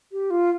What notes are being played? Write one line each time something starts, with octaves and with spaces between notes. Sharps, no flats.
G4
F4